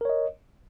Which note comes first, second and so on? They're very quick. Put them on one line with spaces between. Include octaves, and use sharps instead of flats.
A#4 C#5 D#5